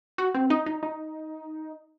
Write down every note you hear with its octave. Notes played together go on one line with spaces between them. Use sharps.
F#4
C4
D#4
D#4
D#4